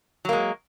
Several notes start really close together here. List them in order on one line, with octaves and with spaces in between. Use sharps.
F#3 A#3 G#3